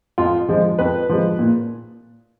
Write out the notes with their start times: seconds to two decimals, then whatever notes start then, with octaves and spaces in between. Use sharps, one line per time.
0.18 F2 F4
0.49 F3 G#3
0.79 F2 B4
1.10 F3 G#3
1.39 A#2